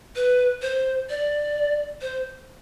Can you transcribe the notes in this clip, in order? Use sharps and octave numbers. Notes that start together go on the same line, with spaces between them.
B4
C5
D5
C5